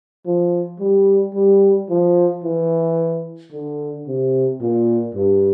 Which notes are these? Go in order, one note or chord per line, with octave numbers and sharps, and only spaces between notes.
F3
G3
G3
F3
E3
D3
C3
A#2
G2